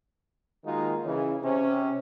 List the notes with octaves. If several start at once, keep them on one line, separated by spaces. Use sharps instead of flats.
D#3 G#3 A#3 D#4 F4 F#4
C#3 E3
C3 C#4